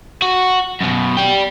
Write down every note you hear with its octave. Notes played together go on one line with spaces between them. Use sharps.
F#4
F#2 B2
D5 G5